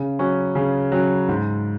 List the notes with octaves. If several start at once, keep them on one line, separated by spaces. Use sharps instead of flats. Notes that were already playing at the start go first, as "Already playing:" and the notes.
Already playing: C#3
F#3 C#4
C#3
F#3 C#4
G#2